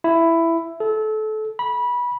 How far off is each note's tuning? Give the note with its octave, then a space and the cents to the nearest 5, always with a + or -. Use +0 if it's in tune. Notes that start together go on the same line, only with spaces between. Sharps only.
E4 +10
A4 -25
B5 -20